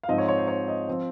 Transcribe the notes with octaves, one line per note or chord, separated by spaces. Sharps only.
F5
G#2 F3 C4 D#4 D#5
C#5
C#5
C5
C#5
D#5
F3 C4 C5